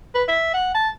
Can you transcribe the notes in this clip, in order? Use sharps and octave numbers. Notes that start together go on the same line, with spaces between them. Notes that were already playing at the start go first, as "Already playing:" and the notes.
B4
E5
F#5
A5